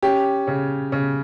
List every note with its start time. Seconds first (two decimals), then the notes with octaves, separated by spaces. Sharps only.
0.02 C#4 G4
0.47 C#3
0.92 C#3